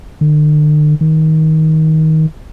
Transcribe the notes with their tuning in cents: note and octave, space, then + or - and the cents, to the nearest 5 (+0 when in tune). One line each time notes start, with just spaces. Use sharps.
D3 +45
D#3 +20